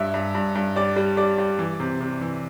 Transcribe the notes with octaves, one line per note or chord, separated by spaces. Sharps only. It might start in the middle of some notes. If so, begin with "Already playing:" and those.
Already playing: G2 E5
G2
G2
G2
G3 D5
G3
G3 D5
G3
E3
C3
C3
E3